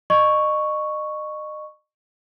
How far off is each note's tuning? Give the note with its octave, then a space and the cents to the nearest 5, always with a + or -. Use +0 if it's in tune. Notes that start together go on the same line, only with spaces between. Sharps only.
D#5 -35 C#6 +0